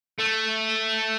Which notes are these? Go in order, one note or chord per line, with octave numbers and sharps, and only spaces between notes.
A3